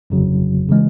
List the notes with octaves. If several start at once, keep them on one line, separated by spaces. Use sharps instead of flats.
G1 F2 C#3 F#3
C#3 E3 G#3